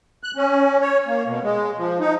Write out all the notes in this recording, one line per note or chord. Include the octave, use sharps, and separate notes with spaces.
F#6
C#4
C#5
A#3
B2
G#3
F3
D#4